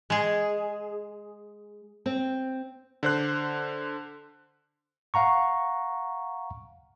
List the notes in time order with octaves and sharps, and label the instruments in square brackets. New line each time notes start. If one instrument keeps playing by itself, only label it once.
[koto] G#3 G#4
[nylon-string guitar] C4
[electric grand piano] D3 C5 F#6
[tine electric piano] F5 F#5 A#5 C#6